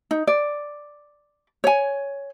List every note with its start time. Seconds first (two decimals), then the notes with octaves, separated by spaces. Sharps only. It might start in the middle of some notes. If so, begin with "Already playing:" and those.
0.11 D#4
0.27 D5
1.64 C#5 G#5